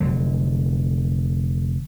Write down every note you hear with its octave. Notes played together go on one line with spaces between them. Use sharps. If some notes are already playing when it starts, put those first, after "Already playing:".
F1 D3 F#3